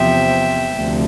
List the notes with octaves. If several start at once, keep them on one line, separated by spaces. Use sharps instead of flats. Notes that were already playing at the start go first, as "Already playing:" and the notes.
Already playing: E2 C3 F3 E5 G5
D2 C3 F3